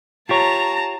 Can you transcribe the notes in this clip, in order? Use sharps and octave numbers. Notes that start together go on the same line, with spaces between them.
F4 G4 C#5 A5 A#5